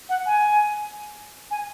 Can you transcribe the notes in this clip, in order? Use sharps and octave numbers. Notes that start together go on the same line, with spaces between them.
F#5
G#5
G#5